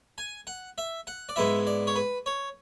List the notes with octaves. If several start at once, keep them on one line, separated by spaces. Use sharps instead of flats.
G#5
F#5
E5
F#5
D5
G#2 G#3 B3 E4 E5
D5
C#5
B4
C#5